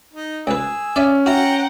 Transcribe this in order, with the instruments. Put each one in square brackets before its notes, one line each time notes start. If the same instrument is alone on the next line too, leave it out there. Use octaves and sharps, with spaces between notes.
[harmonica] D#4
[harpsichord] C#2 B4 [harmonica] G#4 E6
[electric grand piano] C#4 [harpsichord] D5 E5 G#5
[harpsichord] E4 F#4 [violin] F#5 G5 [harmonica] A#5